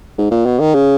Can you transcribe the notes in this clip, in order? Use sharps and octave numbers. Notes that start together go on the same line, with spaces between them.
G#2
A#2
B2
D#3
C#3